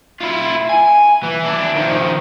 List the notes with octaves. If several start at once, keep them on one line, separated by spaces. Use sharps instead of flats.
E4 F4
G#5
E3
D4 E4
D#3 F3